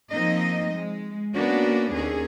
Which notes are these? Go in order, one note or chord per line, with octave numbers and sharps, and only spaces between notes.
F3 A#3 C4 D#4 D#5
G#3
A#3 B3 C#4 D4 F#4
D#2 C#4 G#4